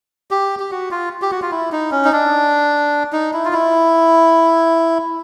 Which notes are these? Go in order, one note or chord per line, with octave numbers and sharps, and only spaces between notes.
G4
G4
F#4
F4
G4
F#4
F4
E4
D#4
C#4
D#4
D4
D#4
E4
F4
E4